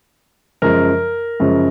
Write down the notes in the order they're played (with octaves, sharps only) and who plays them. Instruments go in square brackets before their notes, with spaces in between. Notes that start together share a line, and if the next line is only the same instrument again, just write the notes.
[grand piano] F#2 C#3 F3 G#3 A#4
F#2 C#3 F3 G#3